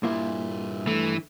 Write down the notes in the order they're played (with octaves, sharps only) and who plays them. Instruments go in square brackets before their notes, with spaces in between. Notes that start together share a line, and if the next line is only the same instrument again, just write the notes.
[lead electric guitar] G2 C5 [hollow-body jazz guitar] A#2 A#3 E4
[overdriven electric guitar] E3 [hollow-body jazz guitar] A3